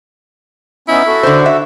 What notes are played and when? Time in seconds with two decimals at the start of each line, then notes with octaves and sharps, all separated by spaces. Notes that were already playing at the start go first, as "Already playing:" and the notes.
0.88 B3 C#4 D#4 E4
1.07 F#4 A4
1.23 D3 C5
1.46 E5